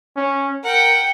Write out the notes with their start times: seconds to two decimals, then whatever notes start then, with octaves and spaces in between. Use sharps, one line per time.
0.16 C#4
0.64 A#4 F#5 G5